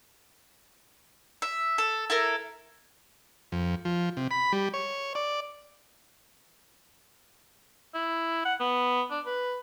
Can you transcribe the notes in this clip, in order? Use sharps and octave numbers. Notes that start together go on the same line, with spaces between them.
E5
A4
E4 A4 A#4
F2
F3
C3
B5
G3
C#5
D5
E4
F#5
B3
D4
B4